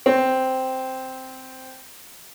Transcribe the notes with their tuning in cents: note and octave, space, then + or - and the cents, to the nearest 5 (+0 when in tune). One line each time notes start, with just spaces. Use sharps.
C4 -5